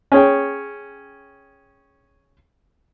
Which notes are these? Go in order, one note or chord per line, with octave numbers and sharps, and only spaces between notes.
C#4 G#4 C#5 G5